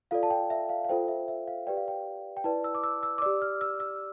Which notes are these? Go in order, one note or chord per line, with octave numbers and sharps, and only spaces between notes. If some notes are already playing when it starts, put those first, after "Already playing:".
F4 A4 D5 F5
A5
G5
E5
F5
F5
F4 A4 C5 G5
E5
E5
F5
G4 B4 D5 G5
F5
G5
G5
E4 B4 D5 A5
E6
D6
E6
E6
D6
G4 D5 E6
F6
E6
E6